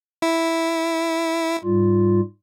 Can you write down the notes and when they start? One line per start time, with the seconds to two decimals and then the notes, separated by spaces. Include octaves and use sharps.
0.22 E4
1.64 G#2 G3 F4